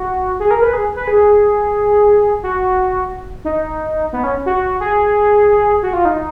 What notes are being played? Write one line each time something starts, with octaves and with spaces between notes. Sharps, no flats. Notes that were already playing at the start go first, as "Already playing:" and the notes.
Already playing: F#4
G#4
A#4
B4
G#4
B4
G#4
F#4
D#4
B3
C#4
F#4
G#4
F#4
F4
D#4